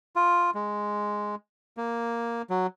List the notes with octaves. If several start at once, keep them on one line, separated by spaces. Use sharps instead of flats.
F4
G#3
A#3
F#3